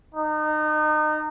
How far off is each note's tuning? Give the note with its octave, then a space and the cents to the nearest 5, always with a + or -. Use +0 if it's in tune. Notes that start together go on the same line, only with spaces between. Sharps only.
D#4 -30